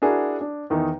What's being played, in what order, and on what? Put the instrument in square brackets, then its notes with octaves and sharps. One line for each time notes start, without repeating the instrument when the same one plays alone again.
[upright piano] D4 E4 F#4 G#4 A#4 F#5
D4
E2 D#3 D#4